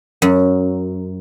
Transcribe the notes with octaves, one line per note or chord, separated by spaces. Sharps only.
F#2